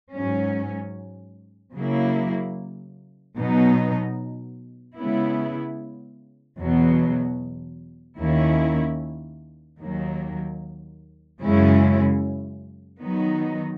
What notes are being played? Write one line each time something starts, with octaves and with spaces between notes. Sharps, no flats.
G#2 F#3 C#4
C#3 F#3 A#3 E4
B2 F#3 B3 D#4
C#3 G#3 B3 E4
E2 B2 F#3 B3
D#2 D#3 A#3 C#4 E4
D#2 D#3 F#3 A#3
F#2 C#3 G#3 C#4 E4
D#3 F#3 B3 D#4